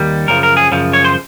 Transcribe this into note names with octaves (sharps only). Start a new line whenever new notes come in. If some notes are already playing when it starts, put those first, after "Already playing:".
Already playing: D#2 D#3 G3
F#2 C#3 F3 A#4
A#4
G#4
F#2 C#3 F3
C#5
C5